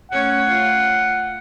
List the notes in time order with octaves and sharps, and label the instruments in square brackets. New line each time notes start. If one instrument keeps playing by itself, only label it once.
[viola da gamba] A3 C#4 C#5 [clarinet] F#5
[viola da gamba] F4